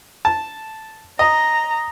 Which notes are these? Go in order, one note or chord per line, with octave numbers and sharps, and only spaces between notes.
A5
D#5 A#5